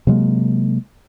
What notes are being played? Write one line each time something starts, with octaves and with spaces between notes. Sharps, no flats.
C3 F#3 G#3 A#3